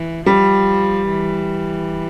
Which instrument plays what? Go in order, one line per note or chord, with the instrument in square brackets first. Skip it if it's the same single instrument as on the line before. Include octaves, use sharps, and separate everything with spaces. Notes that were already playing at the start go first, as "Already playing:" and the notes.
Already playing: [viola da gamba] E3
[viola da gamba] F3 [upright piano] G3
[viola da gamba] E3